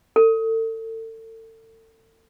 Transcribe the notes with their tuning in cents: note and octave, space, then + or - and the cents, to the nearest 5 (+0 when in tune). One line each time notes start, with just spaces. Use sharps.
A4 +35